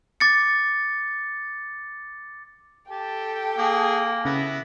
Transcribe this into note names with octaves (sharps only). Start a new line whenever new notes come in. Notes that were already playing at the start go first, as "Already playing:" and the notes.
D6 A6 C#7
G4 A4 G5 A5
A#3 G#4
C#3 B3 E4 F#5 A#6